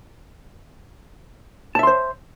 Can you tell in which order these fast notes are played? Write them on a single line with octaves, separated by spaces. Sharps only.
A5 E5 C6 C5